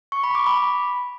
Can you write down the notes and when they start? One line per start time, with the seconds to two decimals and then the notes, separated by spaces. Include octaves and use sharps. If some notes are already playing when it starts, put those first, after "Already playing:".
0.12 C#6
0.24 B5
0.35 D6
0.47 B5